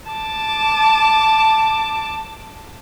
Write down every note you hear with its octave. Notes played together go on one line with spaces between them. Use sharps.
A5 D6